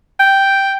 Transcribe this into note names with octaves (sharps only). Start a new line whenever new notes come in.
G5